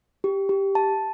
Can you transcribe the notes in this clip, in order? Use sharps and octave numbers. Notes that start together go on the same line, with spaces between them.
G4
G4
A5